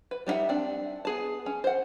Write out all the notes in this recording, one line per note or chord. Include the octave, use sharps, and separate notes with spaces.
B4
G3 D4 D#4 E5 F#5
C4 D4
B3 G#4 A5
C#4
C5 F#5